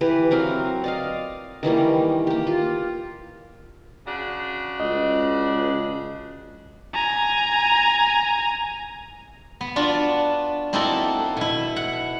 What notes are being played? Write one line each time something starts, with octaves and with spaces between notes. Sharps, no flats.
E3 G4 B4
F#3 C4 A#4 F5
D5 D#5 F5
D#3 E3 G3 A#3
A#3 G4
F4
C#3 D4 F#4
C#2 D#5
G#5 A#5
B3
D4 F4 F#4 D5
A#3 C4 D#4 E4 F#4 A4
B2 E4
F#5